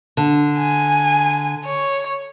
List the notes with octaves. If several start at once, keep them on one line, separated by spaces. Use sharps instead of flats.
D3
G#5
C#5